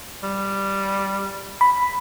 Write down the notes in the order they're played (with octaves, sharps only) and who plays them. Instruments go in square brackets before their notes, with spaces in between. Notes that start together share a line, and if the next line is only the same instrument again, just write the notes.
[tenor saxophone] G3
[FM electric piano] B5